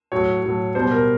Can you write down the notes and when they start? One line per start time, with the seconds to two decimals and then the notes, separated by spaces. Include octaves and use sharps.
0.12 A2 F#3 C#5
0.43 A2 F#3
0.75 B2 G3 C5
0.91 A#4